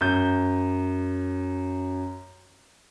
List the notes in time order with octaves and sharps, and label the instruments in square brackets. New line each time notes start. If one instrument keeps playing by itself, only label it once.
[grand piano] F#2 G6